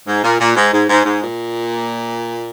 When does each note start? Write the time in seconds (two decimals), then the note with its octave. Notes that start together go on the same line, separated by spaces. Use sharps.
0.07 G#2
0.24 A#2
0.40 A#2
0.56 G#2
0.73 G#2
0.89 G#2
1.05 G#2
1.22 A#2